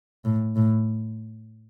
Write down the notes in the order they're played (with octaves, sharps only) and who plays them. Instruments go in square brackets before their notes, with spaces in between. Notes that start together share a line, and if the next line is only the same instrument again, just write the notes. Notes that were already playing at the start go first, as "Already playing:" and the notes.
[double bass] A2
A2